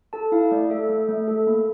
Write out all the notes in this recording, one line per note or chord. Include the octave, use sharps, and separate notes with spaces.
A4 A5
E4 F5
A3 D5
A4 E5
A3
A3
A4
A#3